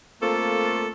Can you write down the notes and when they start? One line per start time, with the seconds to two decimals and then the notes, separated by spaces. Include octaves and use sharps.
0.22 A3 A#3 C4 F4 A4